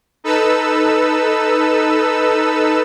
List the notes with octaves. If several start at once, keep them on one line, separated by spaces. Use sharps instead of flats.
D#4 A4 B4 E6